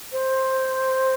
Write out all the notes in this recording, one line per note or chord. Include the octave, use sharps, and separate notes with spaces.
C5